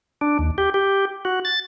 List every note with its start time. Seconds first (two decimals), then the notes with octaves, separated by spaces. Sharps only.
0.21 D4
0.39 D#2
0.58 G4
0.74 G4
1.25 F#4
1.45 A6